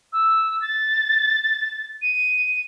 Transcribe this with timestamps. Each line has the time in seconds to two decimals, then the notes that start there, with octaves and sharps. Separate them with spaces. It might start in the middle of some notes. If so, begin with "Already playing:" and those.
0.12 E6
0.61 A6
2.01 D#7